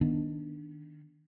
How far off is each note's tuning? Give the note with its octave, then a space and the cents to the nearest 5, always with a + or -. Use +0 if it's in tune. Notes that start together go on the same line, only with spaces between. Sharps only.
D#3 +0 B3 -35 D4 +0